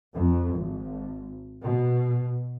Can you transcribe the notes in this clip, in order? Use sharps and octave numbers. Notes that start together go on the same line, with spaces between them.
F2
G#1
B2